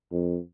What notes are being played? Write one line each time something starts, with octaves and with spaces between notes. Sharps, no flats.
F2